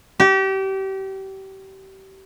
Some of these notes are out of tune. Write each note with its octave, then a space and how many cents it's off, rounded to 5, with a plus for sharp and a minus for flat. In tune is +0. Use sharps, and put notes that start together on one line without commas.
G4 -30